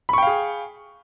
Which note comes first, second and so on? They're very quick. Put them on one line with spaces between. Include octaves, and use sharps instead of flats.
B5 C#6 G5 F5 G#4